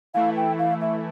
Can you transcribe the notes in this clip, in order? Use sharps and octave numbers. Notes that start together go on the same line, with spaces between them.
E3 A3 E4 F5
G5
F5
E5